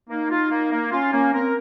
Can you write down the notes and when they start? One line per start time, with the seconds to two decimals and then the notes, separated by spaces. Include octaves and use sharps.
0.09 A#3 D#4
0.30 F4
0.51 A#3
0.71 A#3
0.92 C#4 F4
1.12 A#3 C#4
1.33 C4 A#4